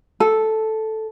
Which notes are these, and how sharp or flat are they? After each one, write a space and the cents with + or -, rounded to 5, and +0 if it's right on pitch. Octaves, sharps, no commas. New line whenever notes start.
A4 -5